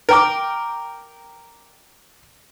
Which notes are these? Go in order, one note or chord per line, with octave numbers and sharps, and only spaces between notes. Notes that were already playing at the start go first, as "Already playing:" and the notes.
A#4 G5 D6